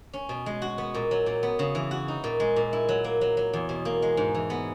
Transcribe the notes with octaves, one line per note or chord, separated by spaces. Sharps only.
C#4
B2
G#3
F#4
B3
A#2
F#3
A#2
B3
C#3
E3
F#4
D#4
A#2
G#3
A#2
E4
F#3
A#3
F#3
F#3
E2
B2
A#3
G#3
G#2
E3
B3